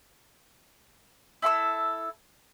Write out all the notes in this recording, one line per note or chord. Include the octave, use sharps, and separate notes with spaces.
E4 A4 C#6 E6